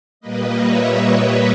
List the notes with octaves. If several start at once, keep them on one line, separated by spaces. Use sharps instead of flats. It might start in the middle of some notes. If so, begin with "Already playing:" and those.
A#2 G3 A#3 B4 D#5
C#5 E5
B4 D#5